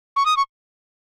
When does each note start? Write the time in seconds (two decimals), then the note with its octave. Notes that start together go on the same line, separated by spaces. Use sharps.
0.16 C#6
0.26 D#6
0.37 C#6